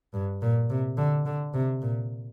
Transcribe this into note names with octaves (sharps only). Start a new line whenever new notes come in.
G2
A#2
C3
D3
D3
C3
A#2